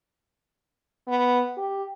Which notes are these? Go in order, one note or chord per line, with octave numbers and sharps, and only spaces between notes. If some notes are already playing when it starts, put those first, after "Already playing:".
B3
G4